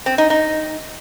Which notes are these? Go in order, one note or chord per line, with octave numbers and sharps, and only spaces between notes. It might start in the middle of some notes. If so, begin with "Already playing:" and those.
C4
D#4
D#4